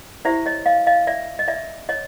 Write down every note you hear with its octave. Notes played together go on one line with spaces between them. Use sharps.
E4 G4 C5 D5 E5
C#5 D#5
D#5 F5
D#5 F5
D5 E5
D#5
D5 E5
C#5 D#5